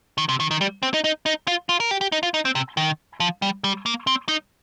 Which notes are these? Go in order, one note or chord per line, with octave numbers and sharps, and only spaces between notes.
D#3
C3
D#3
D#3
G3
C4
D#4
D#4
D#4
F4
F4
A#4
G4
G4
D#4
F4
D#4
C4
C3
D#3
F3
G3
G3
A#3
C4
D#4